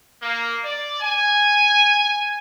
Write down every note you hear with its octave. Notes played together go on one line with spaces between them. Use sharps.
A#3
D5
G#5